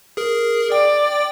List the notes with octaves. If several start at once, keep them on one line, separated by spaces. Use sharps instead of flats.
G#4 A#4
D5 G5